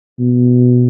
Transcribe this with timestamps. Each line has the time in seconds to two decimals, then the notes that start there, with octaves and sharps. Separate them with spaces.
0.19 B2